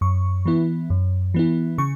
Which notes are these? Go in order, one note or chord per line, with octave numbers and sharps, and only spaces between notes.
F#2 C#6
E3 B3 E4
F#2
E3 B3 E4
C#3 C#6